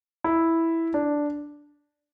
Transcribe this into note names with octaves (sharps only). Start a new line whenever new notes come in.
E4
D4